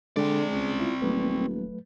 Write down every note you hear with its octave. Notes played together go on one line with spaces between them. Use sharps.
D3 G#3 C4 G#4 D5 G5
C#2
E4 F4
D#1 F#3 A3 B4